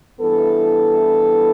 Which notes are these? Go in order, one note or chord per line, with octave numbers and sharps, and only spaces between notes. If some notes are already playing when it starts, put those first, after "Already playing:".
G2 E3 B3 E4 A4